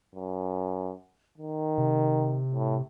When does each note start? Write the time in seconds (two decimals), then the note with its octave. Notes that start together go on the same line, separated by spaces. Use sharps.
0.15 F#2
1.38 D#3
1.78 C3
2.54 A2